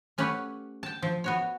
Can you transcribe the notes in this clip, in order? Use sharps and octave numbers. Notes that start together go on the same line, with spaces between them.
A3 C#4 G4 B4 F#5
G5 A5
F3
B3 F#4 C#5